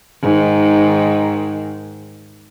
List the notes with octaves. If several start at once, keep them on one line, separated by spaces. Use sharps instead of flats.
G#2 D#3